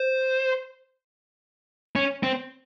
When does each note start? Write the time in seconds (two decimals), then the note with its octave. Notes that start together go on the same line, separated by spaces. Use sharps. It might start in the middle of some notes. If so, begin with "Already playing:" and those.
Already playing: C5
1.96 C#4
2.23 C4